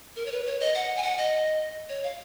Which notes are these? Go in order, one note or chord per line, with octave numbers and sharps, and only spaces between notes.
A#4
C#5
B4
C#5
D#5
F#5
G#5
F#5
D#5
C#5
F5